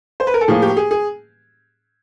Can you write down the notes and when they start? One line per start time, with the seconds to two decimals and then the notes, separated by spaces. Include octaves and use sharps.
0.20 C5
0.27 B4
0.34 A#4
0.41 A4
0.48 A2 F3 A#3 G#4
0.62 G4
0.77 G#4
0.91 G#4